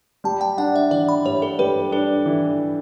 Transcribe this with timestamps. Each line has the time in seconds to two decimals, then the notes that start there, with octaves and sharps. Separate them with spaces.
0.24 G3 A5
0.41 G5
0.58 D4 F#5
0.76 E5
0.91 E3 D5
1.09 B5
1.25 G2 C#5
1.42 A4
1.59 G3 B4
1.92 D4 A4
2.26 E3